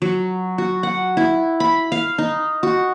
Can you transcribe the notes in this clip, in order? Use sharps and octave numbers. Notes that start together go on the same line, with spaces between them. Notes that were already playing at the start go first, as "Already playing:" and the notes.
F#3
F#4
F#5
E4
B5
F5
D#4
F#4